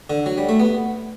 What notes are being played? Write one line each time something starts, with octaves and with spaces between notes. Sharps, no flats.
D3
F#3
G3
A3
B3